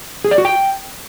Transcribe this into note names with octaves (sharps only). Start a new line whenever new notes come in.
G#4
D5
F#4
G5